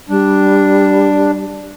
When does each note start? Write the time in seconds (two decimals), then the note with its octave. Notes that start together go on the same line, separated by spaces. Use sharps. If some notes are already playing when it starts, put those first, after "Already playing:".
0.09 G3 D4